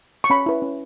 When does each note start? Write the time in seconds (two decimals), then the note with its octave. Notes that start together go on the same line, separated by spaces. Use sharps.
0.24 C#6
0.30 C#4 B5
0.46 E4 B4
0.62 C#4